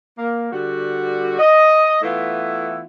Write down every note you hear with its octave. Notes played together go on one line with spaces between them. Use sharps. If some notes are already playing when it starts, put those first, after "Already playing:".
A#3
D3 G3 F#4
D#5
E3 A3 B3 E4 F4